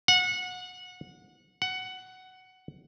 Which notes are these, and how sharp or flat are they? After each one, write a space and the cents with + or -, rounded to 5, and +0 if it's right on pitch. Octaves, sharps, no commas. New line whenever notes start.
F#5 -25
F#5 +10